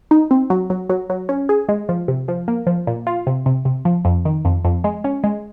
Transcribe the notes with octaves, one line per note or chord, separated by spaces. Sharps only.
D#4
C4
F#3
F#3
F#3
F#3
C#4
G#4
G#3
F3
C3
F3
A#3
F3
A#2
F4
C3
C3
C3
F3
F2
D#3
F2
F2
G#3
C#4
G#3